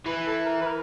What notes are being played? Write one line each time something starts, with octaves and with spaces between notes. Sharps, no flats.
E3 B4
A4
A#4
B4
A#4